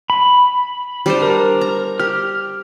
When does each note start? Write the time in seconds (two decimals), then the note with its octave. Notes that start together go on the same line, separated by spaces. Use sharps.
0.10 B5
1.06 G3 D4 C5
1.22 A#4
1.61 A#5
2.00 G4 F6